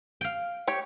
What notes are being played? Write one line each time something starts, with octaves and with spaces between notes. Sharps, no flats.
F5 G5
G4 C#5